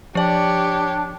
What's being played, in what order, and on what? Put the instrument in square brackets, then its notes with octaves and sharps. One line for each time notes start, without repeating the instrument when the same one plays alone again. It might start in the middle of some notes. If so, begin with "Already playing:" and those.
[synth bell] F3 D5 [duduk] D4 [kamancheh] G4 C#5